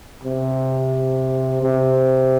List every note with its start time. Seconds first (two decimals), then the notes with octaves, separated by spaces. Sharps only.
0.23 C3
1.62 C3